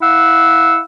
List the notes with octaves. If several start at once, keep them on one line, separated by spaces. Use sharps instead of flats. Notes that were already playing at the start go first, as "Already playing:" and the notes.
E4 F5 F#5 E6